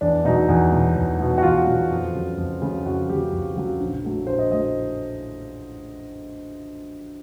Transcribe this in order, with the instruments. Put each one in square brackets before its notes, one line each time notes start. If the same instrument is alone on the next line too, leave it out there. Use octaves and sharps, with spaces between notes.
[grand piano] E2 D4
B2 F#3 D#4
E2
B2 F#3
E2
B2 F#3
F#4
E2 F4
B2 F#3
F2
C#3 F#3
F2
C#3 F#3
F2 F#4
C#3 F#3 G4
F2
C#3 F#3
A#1
A2 F#3 A3
A#1 C5
D#5
A2 F#3 A3 D#5